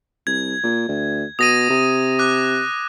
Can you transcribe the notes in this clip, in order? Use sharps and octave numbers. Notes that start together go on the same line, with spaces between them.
C2 G#6
A#2
D2
B2 D#6 A#6 D#7
C3
D6 F#6